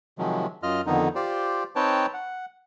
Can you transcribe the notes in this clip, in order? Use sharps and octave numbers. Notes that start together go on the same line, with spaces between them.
C3 D#3 F3 F#3 G#3
F#2 F4 D#5 F6
F2 D3 D#3 B3 D#4
F4 G4 C5 D5
C4 D#4 B4 C#5 G5 A5
F#5